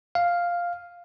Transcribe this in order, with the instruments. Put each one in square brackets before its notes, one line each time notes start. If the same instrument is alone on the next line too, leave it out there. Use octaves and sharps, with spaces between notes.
[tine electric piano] F5